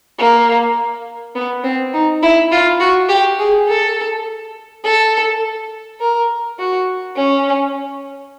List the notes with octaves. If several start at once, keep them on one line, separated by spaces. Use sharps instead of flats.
A#3
B3
C4
D#4
E4
F4
F#4
G4
G#4
A4
A4
A#4
F#4
C#4